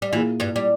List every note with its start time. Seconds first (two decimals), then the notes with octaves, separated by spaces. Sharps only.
0.02 G3
0.13 E2 A#2 E3 A#3 E4 G#4
0.40 G2 G3
0.56 G3